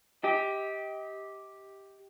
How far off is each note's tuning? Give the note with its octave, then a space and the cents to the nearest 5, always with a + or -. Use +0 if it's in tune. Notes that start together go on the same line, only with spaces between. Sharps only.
G4 +0 D#5 +35